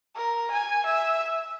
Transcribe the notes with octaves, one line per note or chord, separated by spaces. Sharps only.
A#4
G#5
E5